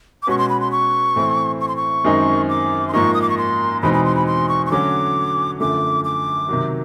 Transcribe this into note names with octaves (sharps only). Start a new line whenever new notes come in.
D6
B2 G#3 C#4 F#4 B4 C#6
C6
B5
C6
C#6
A2 E3 A3 C4 E4
C#6
C6
C#6
F#2 D#3 G#3 C4 D#4
D6
C6
G#2 F3 A#3 D#4 C#6
D#6
D6
C#6
C6
E2 B2 G#3 C4 D#4 B5
B5
C6
B5
C6
C#6
C#6
D3 F#3 A3 C#4 F#4 D6
F#2 D3 F3 A3 D6
D6
C3 D#3 F#3